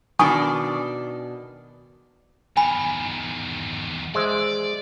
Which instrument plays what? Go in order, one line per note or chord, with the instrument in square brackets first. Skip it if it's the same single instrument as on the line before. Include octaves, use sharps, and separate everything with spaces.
[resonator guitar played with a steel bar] B2 D#3 D4 [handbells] G#5 C#6 D#6
[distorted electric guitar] E2 D#3 [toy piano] G#5 B5
[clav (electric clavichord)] G#3 C5 E5 [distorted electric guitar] D5